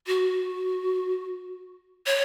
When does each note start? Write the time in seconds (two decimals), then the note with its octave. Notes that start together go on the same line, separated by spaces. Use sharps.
0.07 F#4
2.06 C#5